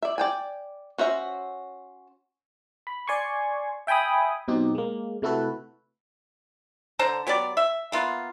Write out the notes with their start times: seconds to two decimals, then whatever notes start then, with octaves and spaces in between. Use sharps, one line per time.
0.02 D5 E5
0.18 D5 G5 G#5
0.98 C#4 F#4 C5 E5
2.87 B5
3.07 D5 G#5 C6 C#6
3.87 E5 G5 G#5 B5 D#6
4.48 B2 F#3 C4 D#4 G4
4.75 G#3 A#3
5.22 C3 A3 E4 F#4 A4 B4
6.99 D3 C5 A5 A#5
7.27 F#3 B3 G4 D5
7.57 E5
7.92 A#3 B3 F4